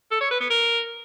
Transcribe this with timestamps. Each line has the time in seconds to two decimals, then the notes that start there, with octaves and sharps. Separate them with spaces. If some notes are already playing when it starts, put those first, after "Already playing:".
0.11 A4
0.21 C#5
0.30 B4
0.40 B3
0.50 A#4